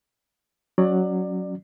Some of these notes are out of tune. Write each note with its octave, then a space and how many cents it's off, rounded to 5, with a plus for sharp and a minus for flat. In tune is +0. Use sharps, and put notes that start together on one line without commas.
F#3 +0 C#4 +0 D5 +20